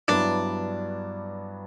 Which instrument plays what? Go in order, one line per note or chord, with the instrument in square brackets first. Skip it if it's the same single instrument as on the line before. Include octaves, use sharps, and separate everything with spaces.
[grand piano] G2 F#3 B3 E4 [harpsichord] D4